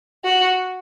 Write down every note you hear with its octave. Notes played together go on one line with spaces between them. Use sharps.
F#4